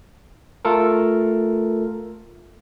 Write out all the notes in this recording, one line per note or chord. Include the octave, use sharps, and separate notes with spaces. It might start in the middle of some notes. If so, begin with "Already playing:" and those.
A3 F4 A4 A#4